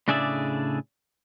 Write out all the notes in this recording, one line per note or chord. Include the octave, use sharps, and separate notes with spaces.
A2 C#3 D4 G#4 D5 E5